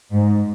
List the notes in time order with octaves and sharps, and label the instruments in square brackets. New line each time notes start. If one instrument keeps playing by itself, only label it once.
[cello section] G#2